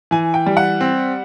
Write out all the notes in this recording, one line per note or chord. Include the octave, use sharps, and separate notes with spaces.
E3 G#5
G5
G3
F#5
C4